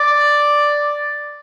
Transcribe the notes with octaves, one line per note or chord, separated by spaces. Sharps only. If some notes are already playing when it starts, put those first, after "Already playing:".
Already playing: D5